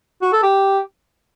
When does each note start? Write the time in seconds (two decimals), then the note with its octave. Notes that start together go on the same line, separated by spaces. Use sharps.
0.22 F#4
0.32 A4
0.43 G4